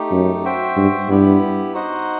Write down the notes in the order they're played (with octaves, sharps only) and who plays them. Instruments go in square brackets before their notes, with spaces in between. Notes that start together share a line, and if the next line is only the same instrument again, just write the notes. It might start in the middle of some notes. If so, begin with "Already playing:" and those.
Already playing: [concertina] A3 D#4 G4
[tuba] F#2
[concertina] F#4 C5 E5 G5
[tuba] G2
[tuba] G2 [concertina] B3 E4 G4
[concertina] D#4 F#4 C5 D#5 F#5